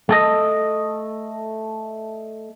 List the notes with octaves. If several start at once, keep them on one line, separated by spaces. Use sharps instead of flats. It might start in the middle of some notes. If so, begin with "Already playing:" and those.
A3 A4 D#5